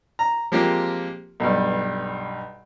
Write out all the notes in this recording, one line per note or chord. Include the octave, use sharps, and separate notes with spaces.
A#5
F3 G#3 A#3 C4 G4
B1 G2